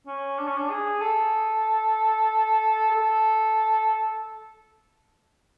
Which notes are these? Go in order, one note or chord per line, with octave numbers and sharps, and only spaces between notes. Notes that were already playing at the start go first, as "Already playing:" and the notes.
C#4
D4
C#4
D4
G#4
A4
A4